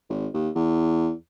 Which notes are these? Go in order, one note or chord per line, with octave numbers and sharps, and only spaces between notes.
G#1
D#2
E2